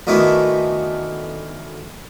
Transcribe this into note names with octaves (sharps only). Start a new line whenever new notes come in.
D2 D#3 E3 A3 B3